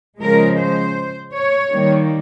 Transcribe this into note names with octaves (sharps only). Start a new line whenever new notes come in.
C#3 F3 G#3 A#4
C5
C#5
D#3 G3 A#3